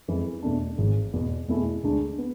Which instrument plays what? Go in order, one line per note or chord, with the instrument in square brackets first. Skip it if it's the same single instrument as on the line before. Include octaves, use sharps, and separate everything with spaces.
[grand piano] F2 E3 G#3
E2 B2 A3 D4
G#1 G#2 G#3
E2 B2 B3
E2 B2 A3 E4 G#4
D2 D3 G#3 D4
B3